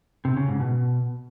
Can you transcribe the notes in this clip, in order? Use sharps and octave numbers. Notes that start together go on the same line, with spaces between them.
C3
C#3
G#2
B2